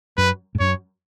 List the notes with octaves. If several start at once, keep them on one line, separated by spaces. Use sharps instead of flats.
F#2 B4
G#2
F#2 C#5